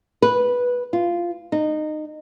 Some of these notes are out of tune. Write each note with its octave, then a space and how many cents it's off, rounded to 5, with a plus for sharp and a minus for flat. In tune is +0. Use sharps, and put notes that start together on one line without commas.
B4 -10
F4 -10
D#4 -20